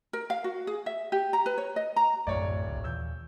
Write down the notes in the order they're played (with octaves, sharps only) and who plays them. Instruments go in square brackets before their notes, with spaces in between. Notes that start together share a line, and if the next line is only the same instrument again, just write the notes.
[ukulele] A#4
F5
F#4
G#4
E5
G4
A#5
B4
C#5
D#5
A#5
[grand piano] D1 C#5 D5 [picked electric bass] A#1 F#2 A3
[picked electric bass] G#1 C#2
[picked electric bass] D#2 A#2 E3 [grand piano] E6 G6